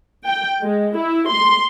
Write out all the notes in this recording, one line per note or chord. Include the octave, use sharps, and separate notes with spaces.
G5
G#3
E4
C6